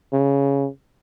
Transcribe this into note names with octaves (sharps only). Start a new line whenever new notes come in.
C#3